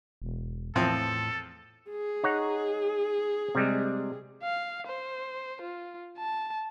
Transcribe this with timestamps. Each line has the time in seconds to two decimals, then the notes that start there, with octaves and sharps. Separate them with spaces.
0.22 E1
0.76 E2 A2 F3 C4 A4
1.91 G#4
2.23 D#4 C#5 F#5
3.55 C3 G3 G#3
4.43 F5
4.86 C5
5.62 F4
6.18 A5